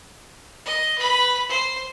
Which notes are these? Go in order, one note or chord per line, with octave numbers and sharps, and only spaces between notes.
D#5
B4 B5
C5